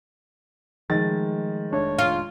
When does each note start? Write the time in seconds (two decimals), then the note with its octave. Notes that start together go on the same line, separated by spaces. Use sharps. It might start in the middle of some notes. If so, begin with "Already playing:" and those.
0.90 D#3 F3 G#3 A3 A6
1.73 F1 A3 D4 C#5
1.99 F4